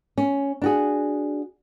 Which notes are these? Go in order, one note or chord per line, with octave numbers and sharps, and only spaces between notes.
C#4
D4 F#4 G#4